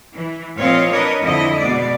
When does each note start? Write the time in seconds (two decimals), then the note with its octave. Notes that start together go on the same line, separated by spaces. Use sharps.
0.15 E3
0.58 A#2 F3 C4 C#5 D#5 F5
0.91 D4 A#4 B4 C#5 D#5
1.21 F2 D3 E4 D#5
1.59 B2 G#3 D5